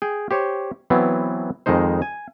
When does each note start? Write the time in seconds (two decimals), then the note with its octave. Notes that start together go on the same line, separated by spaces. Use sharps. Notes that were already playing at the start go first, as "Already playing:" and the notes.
0.02 G#4 G5
0.31 G4 C5 C#5
0.90 E3 F#3 B3 C4
1.66 F2 D#3 G#3 D#4 C5
2.02 G#5